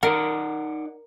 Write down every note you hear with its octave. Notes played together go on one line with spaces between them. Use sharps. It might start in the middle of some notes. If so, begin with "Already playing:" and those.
D#4 A#4 D5 F#5